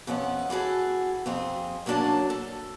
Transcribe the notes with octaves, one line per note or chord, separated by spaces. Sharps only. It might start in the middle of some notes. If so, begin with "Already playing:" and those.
F2 B3 C#4 G#4 F#5
E3 F#4 G#4 A4
F2 C4 G#4
F#3 A#3 C#4 D4 D5 A5
A4